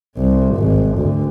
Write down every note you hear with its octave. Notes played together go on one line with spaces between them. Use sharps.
C2
G#1
D2